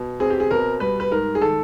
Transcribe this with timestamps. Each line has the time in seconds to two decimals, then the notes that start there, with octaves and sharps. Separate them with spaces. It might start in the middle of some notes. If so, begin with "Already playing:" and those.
Already playing: B2
0.20 C4 G#4
0.30 G4
0.40 G#4
0.51 B2 A#4
0.80 G3 B4
1.00 B4
1.11 G#2 A#4
1.35 G#4
1.41 D#3 A4